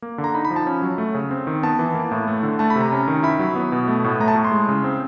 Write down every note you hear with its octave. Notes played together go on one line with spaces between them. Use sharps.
A#3
D3
A#5
D#4 B5
B5
F3
A5
C#4
F#3
A3
C#3
C4
D#3
B3 A5
E3
A#3
A2
A3
D3
A3 A5
B5
C3 A#5
C#4
D#3
E4 B5
F#3
B3
B2
A3
A2
A3 A#5
A5
A2
C6
G#3
C#3
C4